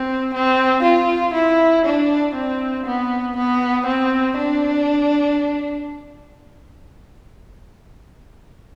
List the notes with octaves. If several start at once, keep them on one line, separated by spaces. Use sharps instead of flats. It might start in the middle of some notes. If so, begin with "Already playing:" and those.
Already playing: C4
C4
F4
E4
D4
C4
B3
B3
C4
D4